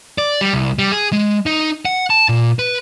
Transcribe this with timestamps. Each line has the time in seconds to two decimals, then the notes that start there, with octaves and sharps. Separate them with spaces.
0.18 D5
0.41 G3
0.53 C2
0.79 G3
0.92 G#4
1.13 G#3
1.46 D#4
1.85 F#5
2.10 A5
2.29 A#2
2.59 B4